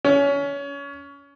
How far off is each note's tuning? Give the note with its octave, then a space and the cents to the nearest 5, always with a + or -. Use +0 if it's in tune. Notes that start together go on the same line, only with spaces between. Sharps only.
C#4 +25